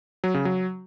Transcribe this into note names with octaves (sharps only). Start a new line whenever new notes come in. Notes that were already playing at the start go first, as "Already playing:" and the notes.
F#3
C#3
F#3